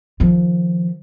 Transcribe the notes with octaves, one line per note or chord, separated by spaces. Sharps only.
D#3 F3